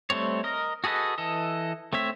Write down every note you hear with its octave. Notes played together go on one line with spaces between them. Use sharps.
G3 A3 C4 C#5
A#4 D#5
F#4 G#4 A4 B4 D#5
E3 A4 D#5
A3 C4 C#5 E5